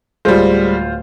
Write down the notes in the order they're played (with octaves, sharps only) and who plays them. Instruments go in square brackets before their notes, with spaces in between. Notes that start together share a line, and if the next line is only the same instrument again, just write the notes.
[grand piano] D1 F4 C5 [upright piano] G3 G#3